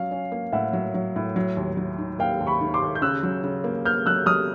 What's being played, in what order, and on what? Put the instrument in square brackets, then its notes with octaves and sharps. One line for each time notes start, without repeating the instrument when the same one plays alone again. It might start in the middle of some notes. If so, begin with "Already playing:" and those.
Already playing: [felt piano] F#3 C#4 [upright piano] F5
[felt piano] C#4
A#3
[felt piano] A2 [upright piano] E5 F#5
[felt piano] F#3
F#3
A2
F#3
D#2
F#3
D#3
[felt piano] A#3 [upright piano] F5 G5
[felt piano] D#2
[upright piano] B5 C#6
[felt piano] D#3
[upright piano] C6 D6
[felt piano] D#2
[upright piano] G6
[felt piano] C#3 [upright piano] E6 F#6
[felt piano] F#3
C#3
A#3
[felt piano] A#3 [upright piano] F6 G6
[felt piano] F#3 [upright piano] E6 F#6
[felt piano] F#3 [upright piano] D#6 F6